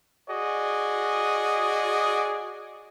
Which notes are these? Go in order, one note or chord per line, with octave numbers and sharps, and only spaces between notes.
F#4 G#4 D5 D#5